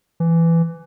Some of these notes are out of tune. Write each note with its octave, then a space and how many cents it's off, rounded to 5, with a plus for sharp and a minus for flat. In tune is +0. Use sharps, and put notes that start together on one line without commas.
E3 +15